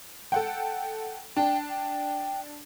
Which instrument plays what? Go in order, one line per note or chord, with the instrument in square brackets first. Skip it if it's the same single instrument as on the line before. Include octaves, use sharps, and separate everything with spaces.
[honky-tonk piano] A4 F#5 G5
[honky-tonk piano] D4 [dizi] G5
[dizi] G5